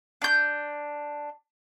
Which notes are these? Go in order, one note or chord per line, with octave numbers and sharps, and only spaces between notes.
D4 G6